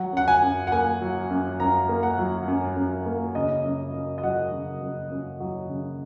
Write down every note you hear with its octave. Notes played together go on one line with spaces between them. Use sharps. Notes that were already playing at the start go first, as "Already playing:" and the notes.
Already playing: F#3 F#5
F#2 F#5
G#5
F#2
F#5
A#3 G#5
F#3
F#2
F#2 A#5
A#3
F#5
F#3
F#2
F#2
A#3
C#3 D#5
F#2
F#2
D#5
F#3 F#5
C#3
F#2
F#2
F#3
C#3